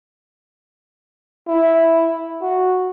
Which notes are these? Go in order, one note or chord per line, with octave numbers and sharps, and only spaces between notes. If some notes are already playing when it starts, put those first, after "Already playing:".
E4
F#4